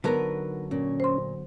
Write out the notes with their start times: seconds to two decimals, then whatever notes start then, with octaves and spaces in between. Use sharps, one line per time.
0.04 D3 F#3 B3 D#4 A#4 B4
0.71 A#2 C#4
1.00 C5 C6